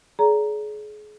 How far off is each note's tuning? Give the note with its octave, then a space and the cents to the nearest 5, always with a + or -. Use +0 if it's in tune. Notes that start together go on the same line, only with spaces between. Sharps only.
G#4 +30 D5 -45 A#5 +0